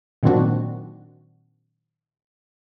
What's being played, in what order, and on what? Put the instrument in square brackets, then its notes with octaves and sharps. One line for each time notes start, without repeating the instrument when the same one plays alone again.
[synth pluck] A#2 D#3 F#3 C4 D4 F#4